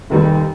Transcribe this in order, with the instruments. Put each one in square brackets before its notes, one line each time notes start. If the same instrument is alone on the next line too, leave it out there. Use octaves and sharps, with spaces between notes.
[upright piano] F1 D#2 D#3 G3